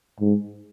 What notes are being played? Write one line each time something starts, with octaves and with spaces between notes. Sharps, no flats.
G#2